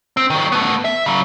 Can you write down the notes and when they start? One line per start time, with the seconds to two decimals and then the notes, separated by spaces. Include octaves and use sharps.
0.17 C4
0.30 D#3 F#3
0.52 A3 B3
0.85 E5
1.06 C#3 F#3